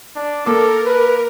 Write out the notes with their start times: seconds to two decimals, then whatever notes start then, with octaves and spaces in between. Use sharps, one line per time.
0.16 D4
0.46 A#3 A4 A#4 D6
0.86 B4